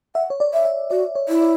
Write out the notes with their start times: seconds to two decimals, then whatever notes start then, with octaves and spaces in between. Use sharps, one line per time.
0.15 E5 F#5
0.30 C#5
0.40 D5
0.53 E5
0.65 E5
0.90 F#4 D5
1.15 C#5
1.29 E4
1.41 D5